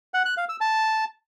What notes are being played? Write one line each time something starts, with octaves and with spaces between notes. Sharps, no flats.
F#5
F#6
F5
E6
A5